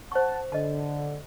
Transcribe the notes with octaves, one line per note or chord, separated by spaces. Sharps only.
C5 F#5 A5 C#6
D3 D#5 A5